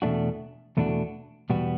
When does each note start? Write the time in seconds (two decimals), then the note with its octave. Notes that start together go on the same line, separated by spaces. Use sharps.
0.02 E2 B2 A3 D4 F#4
0.77 E2 B2 A3 D4 F#4
1.50 E2 B2 G3 B3 F#4